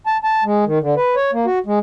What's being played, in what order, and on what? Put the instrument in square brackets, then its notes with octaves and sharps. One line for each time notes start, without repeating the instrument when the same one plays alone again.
[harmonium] A5
A5
G#3
D#3
D3
B4
C#5
A#3
F#4
G#3